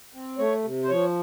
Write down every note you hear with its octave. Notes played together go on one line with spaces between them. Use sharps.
C4
A3 C#5
C3
C5
F3 C#5